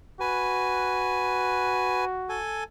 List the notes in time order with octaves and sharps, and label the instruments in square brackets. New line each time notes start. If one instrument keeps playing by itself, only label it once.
[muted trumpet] F#4 [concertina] B4 G#5
[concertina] A4 G#5